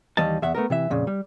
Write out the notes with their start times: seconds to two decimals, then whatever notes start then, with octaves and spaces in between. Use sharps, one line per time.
0.17 D#2 E3 G3 D#5 A5
0.42 E2 E5 F#5
0.55 A3 B3 A#4
0.70 C3 E3 E5
0.90 F2 A#2 C#3
1.07 G3